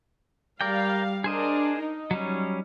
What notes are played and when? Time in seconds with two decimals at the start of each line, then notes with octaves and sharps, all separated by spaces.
0.61 G3 A#4 D5 F5 G5
1.24 D4 G#4 A#4 C5 D#5
1.78 D#4
2.11 F#3 G3 C#4